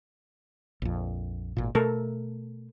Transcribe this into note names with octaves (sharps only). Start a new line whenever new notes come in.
A#1 F2
G#1 A#2
B2 A3 A4 A#4